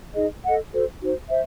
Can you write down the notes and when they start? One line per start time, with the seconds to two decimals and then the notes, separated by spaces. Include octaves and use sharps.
0.16 D#4 G#4 D#5
0.44 A4 D#5 F#5
0.73 F#4 A4 C5
1.01 D#4 F#4 C5
1.30 C5 E5